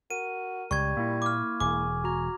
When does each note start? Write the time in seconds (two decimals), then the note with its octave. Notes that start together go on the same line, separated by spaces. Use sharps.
0.10 F#4 A#4 D#7
0.71 C#2 G3 C#6 G#6
0.97 A#2 A#3 E4
1.22 D6 F6
1.61 E1 G#4 D6
2.04 F#4 A#5